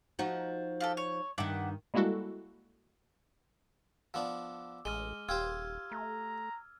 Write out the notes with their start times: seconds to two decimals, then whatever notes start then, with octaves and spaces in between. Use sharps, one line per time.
0.19 F3 D#4 F#4
0.81 F4 G4 A4
0.97 C#5
1.38 G2 D#3 E5 F#5 D6
1.94 G3 G#3 A#3 E4 F#4 A4
4.14 F3 B3 D4 D6 E6
4.85 A1 G#3 F6 D#7 G7
5.29 D#1 F4 G4 C5 E6 F6 G#6
5.91 A3 A#5